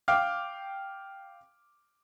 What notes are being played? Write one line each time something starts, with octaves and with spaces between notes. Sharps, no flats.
F5 G5 D6 F6